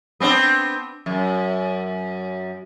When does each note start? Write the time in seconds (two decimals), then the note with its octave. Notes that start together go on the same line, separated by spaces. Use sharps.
0.20 B3 C4 D4
1.06 F#2